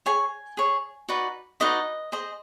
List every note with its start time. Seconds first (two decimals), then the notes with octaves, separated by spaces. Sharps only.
0.06 G#4 C#5 G#5
0.57 G#4 C#5
1.09 D#4 F#4 B4 D5
1.60 D#4 F#4 B4 D5 D#5
2.12 G#4 C5 D#5